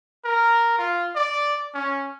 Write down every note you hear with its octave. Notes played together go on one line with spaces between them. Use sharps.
A#4
F4
D5
C#4